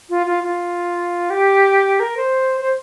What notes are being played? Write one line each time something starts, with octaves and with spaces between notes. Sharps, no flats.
F4
F4
F4
G4
A#4
C5
C5